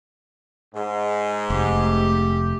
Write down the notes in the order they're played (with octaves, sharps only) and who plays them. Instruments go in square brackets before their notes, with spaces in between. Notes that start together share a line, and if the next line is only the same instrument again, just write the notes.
[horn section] G#2
[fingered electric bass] F1 [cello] A3 G4